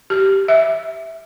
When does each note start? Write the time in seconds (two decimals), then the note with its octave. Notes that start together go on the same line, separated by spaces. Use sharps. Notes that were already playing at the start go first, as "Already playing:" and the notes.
0.10 G4
0.48 E5